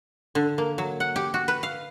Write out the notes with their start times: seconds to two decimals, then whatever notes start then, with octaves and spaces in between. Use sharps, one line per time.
0.35 D3
0.58 A#3
0.78 F#3
1.00 F#5
1.16 G4
1.34 F#4
1.48 B4
1.63 F5